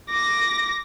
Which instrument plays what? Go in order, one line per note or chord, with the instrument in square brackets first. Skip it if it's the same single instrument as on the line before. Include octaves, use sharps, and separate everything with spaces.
[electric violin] D6 A#6